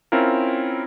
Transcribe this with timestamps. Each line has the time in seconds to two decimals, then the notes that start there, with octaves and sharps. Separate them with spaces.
0.12 C4 C#4 E4 F4 A#4